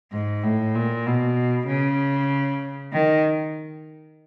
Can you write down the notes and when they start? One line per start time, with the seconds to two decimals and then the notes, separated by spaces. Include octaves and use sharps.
0.12 G#2
0.43 A2
0.75 A#2
1.06 B2
1.68 C#3
2.93 D#3